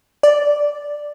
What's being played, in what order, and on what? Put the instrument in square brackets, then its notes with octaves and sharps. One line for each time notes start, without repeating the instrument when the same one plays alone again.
[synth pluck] D5